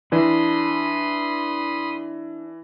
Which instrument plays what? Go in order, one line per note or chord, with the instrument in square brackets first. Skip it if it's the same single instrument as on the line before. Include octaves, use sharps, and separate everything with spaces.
[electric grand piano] E3 [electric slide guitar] D4 [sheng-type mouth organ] B5 C6 D#6